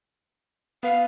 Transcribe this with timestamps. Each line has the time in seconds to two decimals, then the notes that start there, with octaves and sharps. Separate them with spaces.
0.83 B3 B4 F5